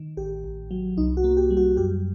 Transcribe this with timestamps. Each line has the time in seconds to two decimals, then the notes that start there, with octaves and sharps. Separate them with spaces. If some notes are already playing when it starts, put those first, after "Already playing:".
Already playing: D#3
0.17 A1 G4
0.44 A1
0.71 F#3
0.97 C2 D#4
1.17 F#4
1.24 A#3
1.37 G4
1.50 G3
1.57 F#4
1.77 F#2 G4